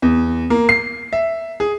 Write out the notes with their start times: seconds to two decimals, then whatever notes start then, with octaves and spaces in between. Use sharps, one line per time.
0.02 E2
0.50 A#3
0.69 C7
1.13 E5
1.60 G#4